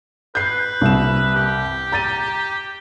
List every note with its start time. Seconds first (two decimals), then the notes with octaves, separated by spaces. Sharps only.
0.35 B4 G6 C7
0.81 C2 E7
1.34 G4
1.92 A#5 A6 D#7